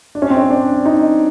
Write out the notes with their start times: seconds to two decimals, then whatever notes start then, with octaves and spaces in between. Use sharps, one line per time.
0.15 D4
0.22 C#4
0.30 C4
0.37 C#4
0.50 D4
0.85 D#4